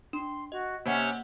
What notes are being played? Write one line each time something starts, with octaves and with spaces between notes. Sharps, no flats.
D4 C6
F#4 D#5
C3 A#3 C#4 F#5 G#5